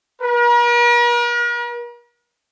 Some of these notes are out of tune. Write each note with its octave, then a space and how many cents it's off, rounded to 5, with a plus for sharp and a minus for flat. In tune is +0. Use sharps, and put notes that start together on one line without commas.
A#4 +45